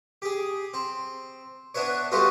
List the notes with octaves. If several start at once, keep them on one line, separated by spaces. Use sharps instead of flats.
G4 G#4
C4
B3 D4 E4 B4 C#5
G3 A3 B3 D#4 F4 F#4